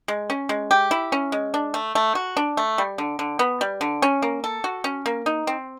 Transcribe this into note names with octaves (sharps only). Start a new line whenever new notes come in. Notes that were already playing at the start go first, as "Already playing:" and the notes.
G#3
C#4
G#3
G4
E4
C#4
G#3
D4
A3
A3
F#4
D4
A3
G3
D3
D3
B3
G3
D3
C#4
A#3
A4
F#4
C#4
A#3
D#4
C4